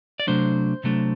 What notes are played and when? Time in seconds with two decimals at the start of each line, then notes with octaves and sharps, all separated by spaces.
0.20 D5
0.27 C3 F#3 A3 D4 C5
0.84 C3 F#3 A3 D4